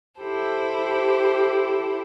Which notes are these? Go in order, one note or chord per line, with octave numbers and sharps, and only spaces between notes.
E4 G4 A4 C5